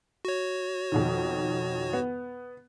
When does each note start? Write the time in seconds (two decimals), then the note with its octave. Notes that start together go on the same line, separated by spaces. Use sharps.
0.25 F#4 C#5
0.92 F2 B2 D#3
1.93 B3